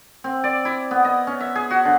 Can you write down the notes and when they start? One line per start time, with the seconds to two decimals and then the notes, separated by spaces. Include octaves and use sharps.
0.24 C4
0.44 D5
0.65 E4
0.91 B3
1.05 D#5
1.27 C#4
1.40 E5
1.55 G#4
1.71 F#4
1.85 D3